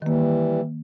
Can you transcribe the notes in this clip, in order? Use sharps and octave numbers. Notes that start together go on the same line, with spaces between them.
D#3 E3 G3 A#3